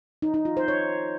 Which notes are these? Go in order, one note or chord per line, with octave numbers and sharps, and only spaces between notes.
D#4
D#4
F4
C5
C#5